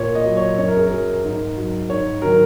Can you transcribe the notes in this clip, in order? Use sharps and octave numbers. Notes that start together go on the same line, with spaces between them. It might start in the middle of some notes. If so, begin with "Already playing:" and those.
Already playing: A#2 C#5
D#5
F#3
C#5
F#2 C#5
A#4
G#4
F#3 A#4
G#2
F#3
G#2 C#5
D#3 F#3 A#4